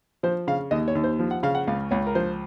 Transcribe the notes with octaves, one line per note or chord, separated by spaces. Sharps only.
F3 C5
C#3 F5
D#2 D#5
C#5
D#2
C5
F3
F#5
C#3 F5
F#5
C#2 F5
C#2 C#5
A#4
F3 C5